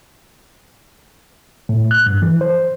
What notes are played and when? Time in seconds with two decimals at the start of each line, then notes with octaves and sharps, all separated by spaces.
1.69 A2
1.91 F#6
2.06 G2
2.22 E3
2.41 C5